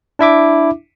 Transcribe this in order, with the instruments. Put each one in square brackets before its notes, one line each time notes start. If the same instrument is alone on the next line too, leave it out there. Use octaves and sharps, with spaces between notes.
[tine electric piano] D4 E4 E5 D6